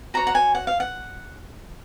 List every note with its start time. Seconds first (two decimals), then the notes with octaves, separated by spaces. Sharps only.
0.14 F#4 C#5 A#5
0.27 F#5
0.35 G#5
0.55 F#5
0.67 F5
0.80 F#5